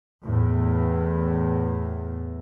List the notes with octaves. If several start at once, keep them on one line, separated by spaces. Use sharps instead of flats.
E2 A2